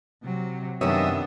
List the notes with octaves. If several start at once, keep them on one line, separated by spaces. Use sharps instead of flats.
C3 F#3
F#2 C3 D#3 B3 D4 C#5 D#5 E5